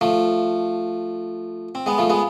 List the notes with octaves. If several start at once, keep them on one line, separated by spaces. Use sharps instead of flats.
F3 A3
C4
G#3 B3
F3 A3
G#3 B3